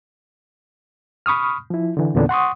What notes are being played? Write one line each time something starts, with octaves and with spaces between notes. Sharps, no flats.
B5 C#6 D#6 F6
F3 E4
D3 E3
E2 A#2 D3 B3 C#4 D4
F#5 C6 C#6 D#6